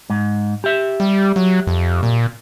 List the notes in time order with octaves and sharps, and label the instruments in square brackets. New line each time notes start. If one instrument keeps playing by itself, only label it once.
[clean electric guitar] G#2
G4 E5
[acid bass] G3
F#3
F2
A#2